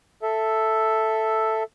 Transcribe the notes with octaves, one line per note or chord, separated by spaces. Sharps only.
A4 E5